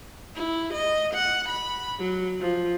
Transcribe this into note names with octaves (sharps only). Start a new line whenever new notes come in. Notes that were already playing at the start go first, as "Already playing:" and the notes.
E4
D#5
F#5
B5
F#3
F3